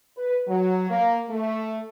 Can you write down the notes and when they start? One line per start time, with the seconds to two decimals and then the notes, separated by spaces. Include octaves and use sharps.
0.17 B4
0.48 F#3
0.90 A#3
1.29 A3